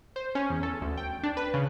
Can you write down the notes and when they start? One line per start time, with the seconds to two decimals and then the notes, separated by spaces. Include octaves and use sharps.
0.16 C5
0.35 C#4
0.50 E2
0.63 A4
0.81 D2
0.97 G5
1.23 D4
1.37 B4
1.54 C#3